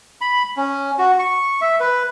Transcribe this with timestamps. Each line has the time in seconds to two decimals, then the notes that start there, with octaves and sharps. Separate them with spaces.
0.21 B5
0.57 C#4
0.98 F#4
1.19 C#6
1.61 E5
1.80 B4